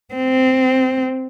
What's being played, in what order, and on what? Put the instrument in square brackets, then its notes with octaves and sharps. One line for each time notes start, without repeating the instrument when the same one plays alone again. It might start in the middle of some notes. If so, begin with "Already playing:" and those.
[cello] C4